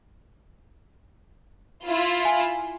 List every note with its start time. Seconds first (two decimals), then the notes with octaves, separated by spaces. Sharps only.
1.85 E4 F4
2.25 G#5